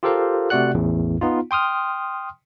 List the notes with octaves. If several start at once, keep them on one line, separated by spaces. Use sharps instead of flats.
F4 G4 A4 A#4 C5 F5
C3 A3 F#4 D5 F#5 F#6
A1 E2 A2
B3 D#4 F4
G5 C6 D#6 F6